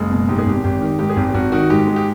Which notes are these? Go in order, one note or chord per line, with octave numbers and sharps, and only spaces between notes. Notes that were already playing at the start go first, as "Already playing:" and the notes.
Already playing: F#1 G#3
B2
G#2 G4
G#4
G#1 G4
G#1 G4
D#3
G#2 G4
G#4
G#1 G4
G4
G#1 F#4
D#3 F#4
G#2 G4
G#3
G4